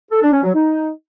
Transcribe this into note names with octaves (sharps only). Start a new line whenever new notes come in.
A4
D4
C#4
F#3
D#4